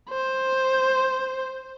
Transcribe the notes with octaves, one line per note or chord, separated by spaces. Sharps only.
C5